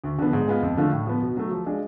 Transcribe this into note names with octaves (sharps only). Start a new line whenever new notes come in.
D2
D3 F3 B3
G#2
G#3 B3 F4
F2
D3 F3 A3 F4
A2
F3 B3
B2
F#3 A3
F3
G#3 D4 F4